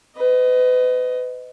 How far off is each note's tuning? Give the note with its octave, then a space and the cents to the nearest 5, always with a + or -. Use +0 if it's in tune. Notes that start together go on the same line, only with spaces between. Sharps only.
B4 +35 D#5 +0